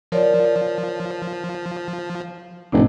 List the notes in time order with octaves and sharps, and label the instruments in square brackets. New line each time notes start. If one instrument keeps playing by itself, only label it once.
[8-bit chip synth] F3 [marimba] A#4 C#5 D5
[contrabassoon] F1 [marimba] A2 C3 D4